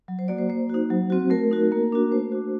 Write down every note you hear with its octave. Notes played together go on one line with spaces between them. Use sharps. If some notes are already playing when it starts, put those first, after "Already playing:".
F#3
C5
A#3 F#4 D5
C5
A#3 C5
D#4 F#4
F#3
C4 F#4
A3 A#4
D#4 F#4
A#3
D4 F#4
A3 C5
D4 F#4